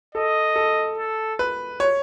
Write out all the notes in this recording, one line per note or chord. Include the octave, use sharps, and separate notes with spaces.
A4 D#5
A4
A4
B4
C#5